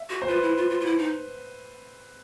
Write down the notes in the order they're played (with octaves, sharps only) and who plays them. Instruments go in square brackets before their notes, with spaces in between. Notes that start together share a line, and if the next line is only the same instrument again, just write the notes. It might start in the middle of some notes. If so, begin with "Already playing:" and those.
Already playing: [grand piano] E5
[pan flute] F#4
[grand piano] C5
[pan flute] F4 [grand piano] B4
[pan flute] E4
F4
F4
F4
E4
D#4